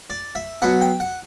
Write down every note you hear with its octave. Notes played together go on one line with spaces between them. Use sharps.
D5
E5
B2 F#3 F#5
G5
F#5